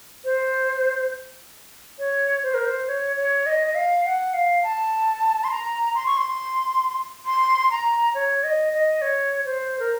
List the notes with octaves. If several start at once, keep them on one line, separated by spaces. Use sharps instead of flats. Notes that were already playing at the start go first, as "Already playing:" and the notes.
C5
C#5
C5
A#4
C5
C#5
C#5
D#5
D#5
F5
F#5
F5
A5
C6
A#5
C6
C#6
C6
C6
A#5
C#5
D#5
D#5
C#5
C5
A#4